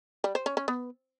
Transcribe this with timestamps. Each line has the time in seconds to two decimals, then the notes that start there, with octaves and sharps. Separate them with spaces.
0.24 G3
0.35 C5
0.46 C#4
0.57 C#4
0.68 B3